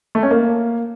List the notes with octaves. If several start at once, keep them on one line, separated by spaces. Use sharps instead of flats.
A3
C#4
A#3